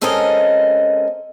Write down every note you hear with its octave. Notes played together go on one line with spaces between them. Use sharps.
G#3 C4 C#4 A4 A#4 D#5